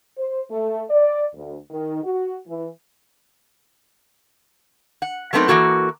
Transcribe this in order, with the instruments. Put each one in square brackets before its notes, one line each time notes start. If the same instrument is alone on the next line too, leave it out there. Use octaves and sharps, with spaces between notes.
[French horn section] C5
A3
D5
D2
D#3
F#4
E3
[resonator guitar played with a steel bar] F#5
F#3 A3 B3 C4 D#4 A#4
E3 F3 A#3 F#4 A4